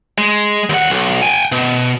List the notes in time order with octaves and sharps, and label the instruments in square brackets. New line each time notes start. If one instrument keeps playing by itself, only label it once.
[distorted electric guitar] G#3
D#2 F#5
B1
G5 G#5
B2